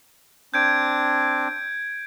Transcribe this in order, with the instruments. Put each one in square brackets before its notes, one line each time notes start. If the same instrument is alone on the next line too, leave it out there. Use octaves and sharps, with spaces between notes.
[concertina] C4 D4 [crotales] G6 G#6 D7